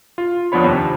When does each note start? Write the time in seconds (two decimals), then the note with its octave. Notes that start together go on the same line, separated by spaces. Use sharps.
0.18 F4
0.52 F2 F3 B3 D4 C#5 B5
0.64 D#2 C3